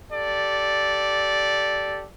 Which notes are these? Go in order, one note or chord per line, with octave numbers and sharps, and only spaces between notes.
G4 A4 D5